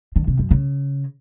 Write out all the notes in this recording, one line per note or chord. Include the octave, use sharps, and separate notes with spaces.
D3
C3
F#2
C#3